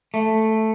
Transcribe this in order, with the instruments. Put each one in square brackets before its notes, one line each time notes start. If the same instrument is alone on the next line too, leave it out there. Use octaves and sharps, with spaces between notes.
[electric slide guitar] A3